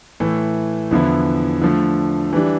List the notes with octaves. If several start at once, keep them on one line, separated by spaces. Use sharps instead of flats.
A2 E3 A3
E2 D3 F3 B3 E4
D3 F3 A3
E3 G3 D4